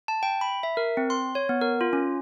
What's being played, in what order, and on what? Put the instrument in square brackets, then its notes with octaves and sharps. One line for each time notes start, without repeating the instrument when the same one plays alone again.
[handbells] A5
G5
B5
E5
A#4
C4
C6
C#5
B3
A#4
F4
C#4